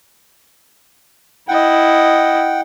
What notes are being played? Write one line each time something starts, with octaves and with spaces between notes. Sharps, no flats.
E4 D#5 F#5 G5